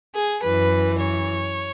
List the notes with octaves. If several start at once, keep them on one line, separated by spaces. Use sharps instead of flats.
G#4
F#2 E3 B4
C#5